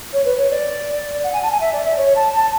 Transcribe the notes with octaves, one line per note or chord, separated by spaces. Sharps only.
C#5
B4
C#5
D5
F#5
G#5
A5
G#5
E5
D5
E5
C#5
A5
A5